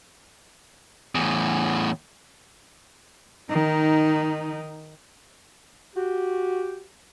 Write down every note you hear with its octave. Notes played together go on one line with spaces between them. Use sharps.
E2 A2
D#3 D#4
F#4 G4